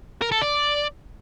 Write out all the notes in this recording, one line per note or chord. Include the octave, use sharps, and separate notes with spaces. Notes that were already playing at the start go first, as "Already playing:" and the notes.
A#4
A4
D5